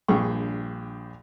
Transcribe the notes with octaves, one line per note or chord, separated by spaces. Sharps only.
A#1 G2 G#4 G5 C#6